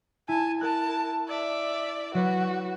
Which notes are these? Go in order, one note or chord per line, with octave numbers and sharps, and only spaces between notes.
E4 G#5 A5
A#4 A5 F#6 A6
D5 E5
F#3 F#4 B4